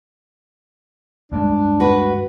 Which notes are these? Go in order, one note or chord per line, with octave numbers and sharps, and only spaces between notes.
D2 G2 G#3 D4
F#4 B4